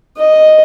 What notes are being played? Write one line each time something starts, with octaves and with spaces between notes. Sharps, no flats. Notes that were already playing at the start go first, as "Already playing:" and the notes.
D#5